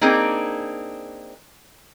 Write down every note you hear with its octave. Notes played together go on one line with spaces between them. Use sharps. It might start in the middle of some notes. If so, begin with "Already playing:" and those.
A#3 C4 D4 D#4 G#4